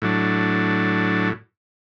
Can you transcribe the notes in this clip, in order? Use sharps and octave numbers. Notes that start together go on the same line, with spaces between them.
A2 F#3 D4